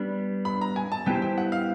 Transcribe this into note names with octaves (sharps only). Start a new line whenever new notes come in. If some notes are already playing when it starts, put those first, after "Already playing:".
Already playing: G3 B3 D4
B5
A#5
G#5
A5
G3 B3 E4 G4 C5 G5
G5
F#5
F5